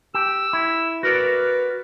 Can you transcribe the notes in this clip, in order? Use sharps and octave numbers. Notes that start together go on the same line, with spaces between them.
G4 E6
E4
F#4 A#4 B4 D5